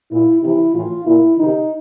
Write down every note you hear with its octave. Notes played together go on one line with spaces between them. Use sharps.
A#2 E4
C3 E3 E4
A2 E3 F4
A#2 E4
C3 D#3 D#4